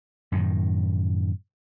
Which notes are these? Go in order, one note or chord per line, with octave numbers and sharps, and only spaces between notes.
F#2 A2 D#3